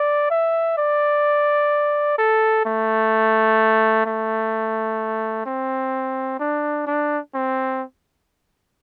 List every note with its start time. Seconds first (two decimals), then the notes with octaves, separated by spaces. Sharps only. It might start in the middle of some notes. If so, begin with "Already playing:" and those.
Already playing: D5
0.30 E5
0.78 D5
2.19 A4
2.65 A3
4.06 A3
5.46 C4
6.40 D4
6.87 D4
7.34 C4